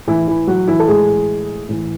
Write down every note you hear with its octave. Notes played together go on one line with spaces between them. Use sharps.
A2 E3 E4
E3 E4
F#3 F#4
E3 E4
A4
A2 E3 G#3 G#4
A2 E3